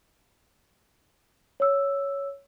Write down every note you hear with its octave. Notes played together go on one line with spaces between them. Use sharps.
C#5 E6